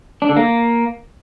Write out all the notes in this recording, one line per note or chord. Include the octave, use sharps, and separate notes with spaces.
D4
D3
A#3